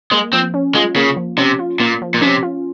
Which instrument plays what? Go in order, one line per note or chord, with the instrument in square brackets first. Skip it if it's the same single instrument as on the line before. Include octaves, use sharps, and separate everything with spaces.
[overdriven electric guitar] G#3 [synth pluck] A#3
[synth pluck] F3 [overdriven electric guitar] C4
[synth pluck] C#4
[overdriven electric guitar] G#3 [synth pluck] F4
[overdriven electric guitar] C#3 [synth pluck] A#3
[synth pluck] F3
[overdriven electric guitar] C3 [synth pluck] C#4
[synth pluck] F4
[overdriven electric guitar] A#2 [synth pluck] A#3
[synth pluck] F3
[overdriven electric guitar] A#2
[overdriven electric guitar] C3 [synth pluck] C#4
[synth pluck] F4